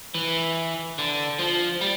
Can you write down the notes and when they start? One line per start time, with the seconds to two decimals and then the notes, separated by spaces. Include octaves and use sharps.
0.14 E3
0.98 D3
1.39 F3
1.82 G3